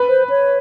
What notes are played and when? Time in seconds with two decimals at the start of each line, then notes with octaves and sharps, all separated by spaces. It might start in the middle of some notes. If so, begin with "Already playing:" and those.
Already playing: B4
0.09 C5
0.29 C#5